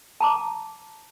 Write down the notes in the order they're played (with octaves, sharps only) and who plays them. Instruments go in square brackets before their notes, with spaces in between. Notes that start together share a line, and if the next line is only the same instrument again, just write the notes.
[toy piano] A5 A#5 D6